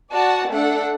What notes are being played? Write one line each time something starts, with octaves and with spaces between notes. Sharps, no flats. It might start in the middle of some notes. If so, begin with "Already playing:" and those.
F#4 D5 F#5 A5
A3 D4 A4 F#5